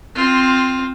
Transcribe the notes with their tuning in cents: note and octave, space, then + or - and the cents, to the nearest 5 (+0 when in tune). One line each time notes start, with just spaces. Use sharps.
C4 +0 F4 +10